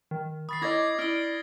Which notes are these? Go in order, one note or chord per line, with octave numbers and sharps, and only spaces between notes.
D#3
B5 C#6 D#6 A6 C7
E4 C#5 D#5 D6 D#6 G#6 A#6
E4 D5 F6 D7 G7